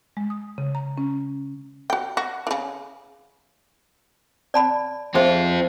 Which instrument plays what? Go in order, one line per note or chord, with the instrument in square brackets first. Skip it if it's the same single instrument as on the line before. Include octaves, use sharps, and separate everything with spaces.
[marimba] G#3
D#6
C#3
A#5
C#4
[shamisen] F#4 G5
F#4
C#3 E3
[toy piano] D5 A5 B5
[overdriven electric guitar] C4 F4 [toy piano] G#4 C5 E5